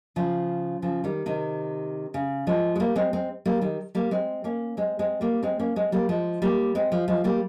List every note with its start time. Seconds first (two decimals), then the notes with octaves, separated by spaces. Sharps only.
0.16 C#3 F3
0.82 C#3 F3
1.04 D#3 G3
1.26 C3 D#3
2.14 C#3
2.47 F3 G#3
2.76 G#3
2.80 G3 A#3
2.96 G#3 C4
3.13 G#3 C4
3.46 G3 A#3
3.61 D#3 G3
3.95 G3 A#3
4.11 G#3 C4
4.44 A#3 C#4
4.77 G#3 C4
4.99 G#3 C4
5.21 G3 A#3
5.43 G#3 C4
5.60 A#3 C#4
5.76 G#3 C4
5.92 G3 A#3
6.09 F3 G#3
6.42 G3 A#3
6.75 G#3 C4
6.92 F3 G#3
7.08 F3 G#3
7.24 G3 A#3